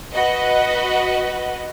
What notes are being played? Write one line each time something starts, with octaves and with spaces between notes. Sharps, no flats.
F#4 B4 D#5